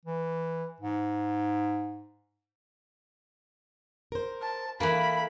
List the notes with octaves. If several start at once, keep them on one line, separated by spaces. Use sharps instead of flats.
E3
G#2
A#4 C5
A5
E3 A#3 A4 A#4 G#5 B5